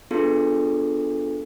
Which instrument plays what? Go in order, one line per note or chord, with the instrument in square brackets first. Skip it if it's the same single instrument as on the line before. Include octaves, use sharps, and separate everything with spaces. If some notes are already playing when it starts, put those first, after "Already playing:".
[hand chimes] B3 D4 F4 G#4 A4